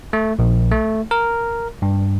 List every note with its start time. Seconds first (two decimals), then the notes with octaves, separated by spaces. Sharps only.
0.13 A3
0.39 A#1
0.71 A3
1.11 A#4
1.82 G2